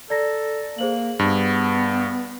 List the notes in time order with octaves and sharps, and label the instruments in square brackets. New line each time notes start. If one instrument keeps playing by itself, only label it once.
[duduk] A4 [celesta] D5 A#5 A#6
[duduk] A#3 [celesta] G#4 C5 F#7
[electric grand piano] G2 [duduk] B3